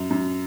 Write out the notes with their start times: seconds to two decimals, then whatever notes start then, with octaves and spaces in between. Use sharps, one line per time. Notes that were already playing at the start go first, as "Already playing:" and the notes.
Already playing: F#2
0.11 F#2